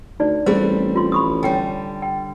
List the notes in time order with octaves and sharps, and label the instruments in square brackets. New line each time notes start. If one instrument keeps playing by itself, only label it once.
[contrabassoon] D2 [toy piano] D#4 D5
[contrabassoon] A1 [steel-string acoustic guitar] G3 A3 C4 [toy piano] G#4 C5
[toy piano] F4 C6
B5 C#6 D#6
[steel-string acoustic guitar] D3 G3 [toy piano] C#5 G5 G#5
[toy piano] G5